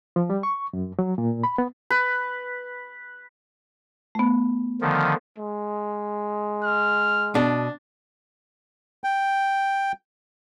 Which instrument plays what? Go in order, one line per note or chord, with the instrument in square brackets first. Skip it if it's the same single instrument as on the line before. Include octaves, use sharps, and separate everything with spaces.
[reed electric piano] F3
G3
C#6
F#2
F#3
A#2
B5
B3
[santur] B4
[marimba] A3 B3
[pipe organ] D3 D#3 F3
[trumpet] G#3
[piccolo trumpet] F6
[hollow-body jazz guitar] B2 [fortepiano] D4
[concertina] G5